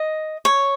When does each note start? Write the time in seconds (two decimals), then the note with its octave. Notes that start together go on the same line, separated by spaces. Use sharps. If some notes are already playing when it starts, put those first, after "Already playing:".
Already playing: D#5
0.45 C#5